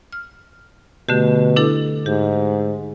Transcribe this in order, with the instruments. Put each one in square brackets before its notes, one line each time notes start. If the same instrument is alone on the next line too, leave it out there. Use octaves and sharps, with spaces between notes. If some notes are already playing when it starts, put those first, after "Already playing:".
[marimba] F6
[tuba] B2 [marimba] D3 A3 G4
[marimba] D4 E4 A4
[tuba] G#2 [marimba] G4